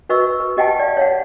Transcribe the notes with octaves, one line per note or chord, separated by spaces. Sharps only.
F#4 B4 D#5 C#6 E6
B4
G4 D#5 F#5 G5 A5
D5 F5
C#5 F5 F#5